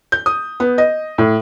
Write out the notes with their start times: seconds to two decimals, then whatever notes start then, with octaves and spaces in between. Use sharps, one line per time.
0.12 G6
0.26 D#6
0.60 B3
0.78 D#5
1.18 A2